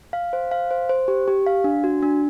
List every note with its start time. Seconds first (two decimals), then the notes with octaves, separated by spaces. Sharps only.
0.13 F5
0.33 C5
0.51 F5
0.71 C5
0.89 C5
1.08 G4
1.28 G4
1.47 F5
1.64 D4
1.84 F#4
2.03 D4